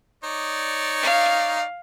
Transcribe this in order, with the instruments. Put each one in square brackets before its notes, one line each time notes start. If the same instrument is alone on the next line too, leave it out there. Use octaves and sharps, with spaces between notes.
[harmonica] D#4 C#5 D5
[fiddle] F5